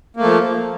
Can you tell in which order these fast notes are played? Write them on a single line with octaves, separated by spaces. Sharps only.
A#3 A3 F3